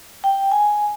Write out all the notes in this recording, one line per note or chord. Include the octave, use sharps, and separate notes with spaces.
G5
G#5